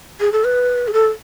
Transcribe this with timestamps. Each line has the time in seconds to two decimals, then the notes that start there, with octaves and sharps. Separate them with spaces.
0.20 G#4
0.32 A4
0.44 B4
0.88 G#4
0.93 A4